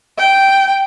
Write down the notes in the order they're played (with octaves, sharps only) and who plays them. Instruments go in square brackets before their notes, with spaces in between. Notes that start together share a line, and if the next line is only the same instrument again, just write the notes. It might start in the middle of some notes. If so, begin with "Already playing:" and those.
[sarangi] G5